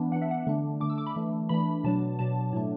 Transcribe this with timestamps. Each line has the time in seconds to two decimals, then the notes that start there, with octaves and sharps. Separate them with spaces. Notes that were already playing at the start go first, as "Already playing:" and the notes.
Already playing: E3 B3 D4
0.12 E3 B3 D4 F#5
0.22 E5
0.31 F#5
0.47 D3 A3 D4
0.80 D3 A3 D4 D6
0.90 E6
0.98 D6
1.07 B5
1.16 E3 A3 D4
1.49 E3 A3 D4 B5
1.84 B2 F#3 D4 A5
2.19 B2 F#3 D4 A5
2.53 A2 F#3 A3 D4